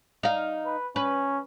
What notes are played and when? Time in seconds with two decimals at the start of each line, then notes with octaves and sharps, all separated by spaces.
0.23 D#4 F5
0.66 B4
0.96 C#4 B4